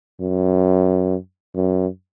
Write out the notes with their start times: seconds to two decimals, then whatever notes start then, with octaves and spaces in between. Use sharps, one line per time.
0.20 F#2
1.55 F#2